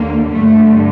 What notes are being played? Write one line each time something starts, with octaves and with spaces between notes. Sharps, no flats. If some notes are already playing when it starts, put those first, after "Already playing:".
Already playing: D#2 D3 A#3
G2 D3 A3